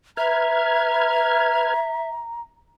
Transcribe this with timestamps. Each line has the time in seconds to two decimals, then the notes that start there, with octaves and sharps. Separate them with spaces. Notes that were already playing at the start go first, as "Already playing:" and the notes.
0.17 B4 E5 A#5 F6 G#6